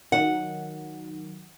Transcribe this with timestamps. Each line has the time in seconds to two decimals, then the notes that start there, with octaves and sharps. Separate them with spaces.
0.12 D#3 F#3 F#5